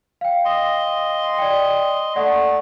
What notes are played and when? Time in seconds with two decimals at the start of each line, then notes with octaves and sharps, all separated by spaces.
0.21 F5 G5
0.45 D#5 C6
1.38 D5 G5
2.16 A3 D5 F#5